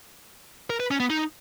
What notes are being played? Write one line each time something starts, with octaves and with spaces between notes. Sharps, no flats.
A#4
B4
C#4
B3
D#4